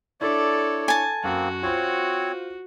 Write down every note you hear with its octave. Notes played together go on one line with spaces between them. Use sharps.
D4 E4 A4 C#5 D5
G#5 A5
F#2 A#3 C4 F#4
C4 F4 C5 C#5